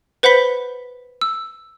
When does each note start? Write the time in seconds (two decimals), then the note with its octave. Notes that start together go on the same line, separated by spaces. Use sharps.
0.23 B4 C5 F#5 B5 B6 G7
1.21 E6